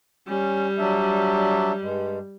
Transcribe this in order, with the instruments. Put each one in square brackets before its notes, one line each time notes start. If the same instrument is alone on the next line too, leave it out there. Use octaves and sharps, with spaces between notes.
[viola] G3 [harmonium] C#4
[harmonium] F#3 D4 E5
G2 G#3